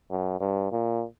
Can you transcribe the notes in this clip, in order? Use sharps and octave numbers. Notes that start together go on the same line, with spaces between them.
F#2
G2
A#2